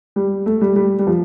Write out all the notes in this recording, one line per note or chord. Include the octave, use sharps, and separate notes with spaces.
G3
A3
G3
G3
G3
F3